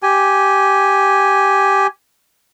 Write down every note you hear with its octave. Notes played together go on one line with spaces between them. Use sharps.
G4 G#5